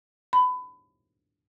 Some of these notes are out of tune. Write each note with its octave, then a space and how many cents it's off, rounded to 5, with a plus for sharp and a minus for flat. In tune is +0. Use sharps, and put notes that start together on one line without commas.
B5 +25